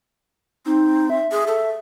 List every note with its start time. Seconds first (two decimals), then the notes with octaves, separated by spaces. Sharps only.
0.66 C4 D#4
1.10 E5
1.32 G#4
1.47 A4